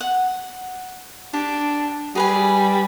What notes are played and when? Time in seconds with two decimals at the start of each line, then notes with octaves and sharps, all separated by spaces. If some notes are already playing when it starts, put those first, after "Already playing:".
0.01 F#5
1.33 D4 G4
2.15 G3 G#4 B4 G#5